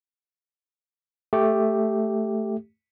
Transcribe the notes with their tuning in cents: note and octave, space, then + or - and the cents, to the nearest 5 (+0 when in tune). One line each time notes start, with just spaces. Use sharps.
A3 +0 G4 +0